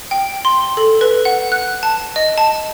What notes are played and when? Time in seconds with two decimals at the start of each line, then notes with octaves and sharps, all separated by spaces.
0.11 G5
0.45 C6
0.77 A4
1.01 B4
1.25 F#5
1.52 F#6
1.83 A5
2.16 D#5
2.38 A5